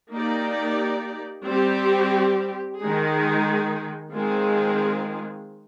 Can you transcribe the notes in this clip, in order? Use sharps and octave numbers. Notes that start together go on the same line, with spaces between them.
A#3 D#4 G4 D5
G3 C4 G4
D#3 G#3 D#4 G#4
D#3 G#3 C4 F4 G#4